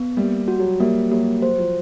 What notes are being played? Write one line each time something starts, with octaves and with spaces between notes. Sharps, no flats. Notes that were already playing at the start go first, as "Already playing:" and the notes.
Already playing: B3
G3 A#3
F#4
F#3
G3 A#3
F#3 A#3
F#3 C5
F3